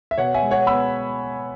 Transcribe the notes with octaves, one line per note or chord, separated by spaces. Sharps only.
E5
B2 C#5 F#5
E5 G#5
G#3
C#5 F#5
B3 B5 E6